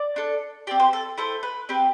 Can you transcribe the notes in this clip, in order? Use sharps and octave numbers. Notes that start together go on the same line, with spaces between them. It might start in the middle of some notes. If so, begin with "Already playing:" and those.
Already playing: D5
D4 A4
C4 G4 D5
C5
A4
A3 E4 A4 C5
B4
C4 G4 B4